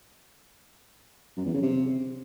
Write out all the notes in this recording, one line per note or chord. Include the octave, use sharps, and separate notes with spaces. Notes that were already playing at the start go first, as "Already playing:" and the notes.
F#2
E2
C#3
C3